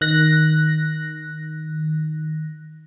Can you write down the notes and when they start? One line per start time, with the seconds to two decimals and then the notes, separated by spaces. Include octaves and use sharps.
0.01 D#3 F#6 A#6